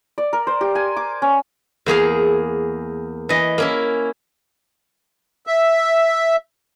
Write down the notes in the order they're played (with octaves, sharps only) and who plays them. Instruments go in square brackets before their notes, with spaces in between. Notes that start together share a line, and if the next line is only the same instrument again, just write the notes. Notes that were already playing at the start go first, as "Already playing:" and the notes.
[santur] D5
A#4
C5
G4
G#5
D6
C#4
[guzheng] E2 A#3 G#4 F5
E3 D#5
A#3 C#4 E4
[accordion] E5